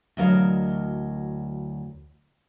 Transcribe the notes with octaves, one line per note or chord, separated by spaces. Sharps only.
D2 E3 F#3 A#4 D#5 F5